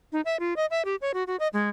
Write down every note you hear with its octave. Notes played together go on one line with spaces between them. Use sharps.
D#4
E5
F4
D#5
E5
G4
C#5
F#4
F#4
D#5
G#3